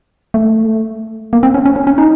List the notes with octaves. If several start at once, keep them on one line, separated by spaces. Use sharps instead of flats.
A3
A#3
C4
C#4
C#4
C#4
C#4
D#4